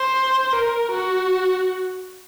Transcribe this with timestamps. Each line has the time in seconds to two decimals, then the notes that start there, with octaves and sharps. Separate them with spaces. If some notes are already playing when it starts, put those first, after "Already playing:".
Already playing: C5
0.53 A#4
0.92 F#4